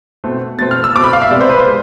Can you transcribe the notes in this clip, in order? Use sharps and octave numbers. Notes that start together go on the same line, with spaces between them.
B2 A3 C4
B2 A3 C4 A6
F6
E6
B2 A3 C4 D6
B5
F5
E5
C3 G#3 B3 D5
C5
B4
C5
G#3 B3